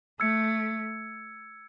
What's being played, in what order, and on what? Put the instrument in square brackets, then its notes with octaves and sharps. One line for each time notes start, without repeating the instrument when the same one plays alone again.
[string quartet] A3 [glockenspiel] E6 G#6 C#7